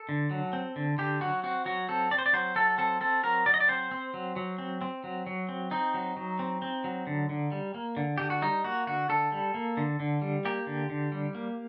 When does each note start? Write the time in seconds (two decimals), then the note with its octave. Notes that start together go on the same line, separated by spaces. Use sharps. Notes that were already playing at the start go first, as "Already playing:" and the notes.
Already playing: A4
0.09 D3
0.31 F#3
0.53 C4
0.76 D3
0.98 D3 G4
1.21 F#3 F#4
1.43 C4 F#4
1.66 F#3 F#4
1.89 C4 A4
2.11 C4 D5
2.19 C5
2.26 D5
2.33 F#3 C5
2.55 F#3 A4
2.78 C4 A4
3.01 C4 A4
3.23 F#3 A#4
3.46 F#3 D5
3.54 D#5
3.60 D5
3.68 C4 C5
3.91 C4
4.14 F#3
4.36 F#3
4.58 C4
4.81 C4
5.04 F#3
5.27 F#3
5.49 C4
5.71 C4 D#4
5.94 F#3
6.17 F#3
6.39 C4
6.62 C4
6.84 F#3
7.07 D3
7.29 D3
7.52 G3
7.74 A#3
7.97 D3
8.18 D3 G4
8.30 F#4
8.42 G3 D#4
8.64 A#3 F#4
8.87 D3 F#4
9.09 D3 A4
9.32 G3
9.54 A#3
9.77 D3
10.00 D3
10.22 G3
10.45 A#3 G4
10.67 D3
10.90 D3
11.12 G3
11.35 A#3